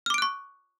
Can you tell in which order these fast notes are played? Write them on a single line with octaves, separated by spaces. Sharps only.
F6 D6 D7 F#6 C#6